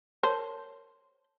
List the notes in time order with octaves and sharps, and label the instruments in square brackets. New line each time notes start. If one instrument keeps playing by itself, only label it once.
[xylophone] A#4 C#5 A5 [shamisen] C5